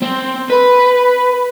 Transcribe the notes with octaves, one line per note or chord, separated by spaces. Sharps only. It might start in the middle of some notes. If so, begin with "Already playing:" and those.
C4
B4